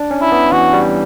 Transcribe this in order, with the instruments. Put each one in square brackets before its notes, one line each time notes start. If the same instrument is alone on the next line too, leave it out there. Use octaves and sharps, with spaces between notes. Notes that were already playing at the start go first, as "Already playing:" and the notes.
Already playing: [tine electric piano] D4
C#4
[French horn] E4
[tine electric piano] B3
[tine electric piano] E3 [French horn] F#4
[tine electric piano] G3